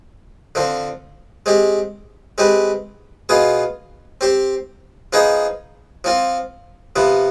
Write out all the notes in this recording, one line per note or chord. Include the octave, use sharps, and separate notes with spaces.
D3 F3 C4
G#3 C4 G4
G#3 C4 G4 B4
B2 B3 F4 G#4
C4 G4 C5
F3 B3 D#4 G#4
F3 C4 F4
C3 F3 B3